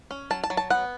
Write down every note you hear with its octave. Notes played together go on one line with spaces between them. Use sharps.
C#4
F#3 A5
A5
F#3
A5
B3 F#5